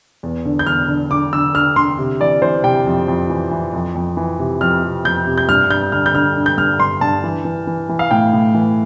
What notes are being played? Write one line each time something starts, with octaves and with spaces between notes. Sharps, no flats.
E2
D3
G6
E2 F6
D3
D3 D6
D3 E6
D3 F6
D3 C6
C3
E3 D5
E3 C5
C3 G5
F2
F2
E3
E3
F2
F2
E3
C3
F2 F6
C3
F2 G6
C3
G6
G2 F6
G2 G6
D3 F6
G6
D3 F6
D3
G6
G2 F6
G2 C6
G2 A5
E3
E3
E3
E3
F5
A2 G5
A2
E3